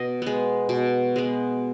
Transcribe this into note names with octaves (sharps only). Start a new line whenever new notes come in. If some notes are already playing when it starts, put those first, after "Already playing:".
Already playing: B2 D#5
G#3 B3
B2
G#3 B3